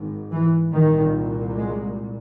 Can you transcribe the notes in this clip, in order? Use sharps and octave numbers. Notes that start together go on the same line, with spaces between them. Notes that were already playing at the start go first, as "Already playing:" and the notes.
Already playing: G#1 G#2
E3
C2 A#2 D#3
G#3